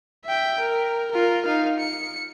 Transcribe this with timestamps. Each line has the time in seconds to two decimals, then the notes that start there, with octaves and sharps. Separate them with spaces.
0.25 E5 G5
0.60 A#4
1.11 F4 A#4
1.45 D#4 F5
1.79 C#7